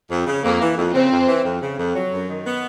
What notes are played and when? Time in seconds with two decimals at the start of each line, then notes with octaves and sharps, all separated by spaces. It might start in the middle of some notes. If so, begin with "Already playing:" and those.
0.10 F2
0.27 C#3
0.44 F2 A#3
0.61 E3
0.77 F2
0.94 C#3 C4
1.11 F2
1.28 E3
1.44 F2
1.62 C#3
1.79 F2
1.95 F#3
2.12 F#2
2.29 D#3
2.45 B3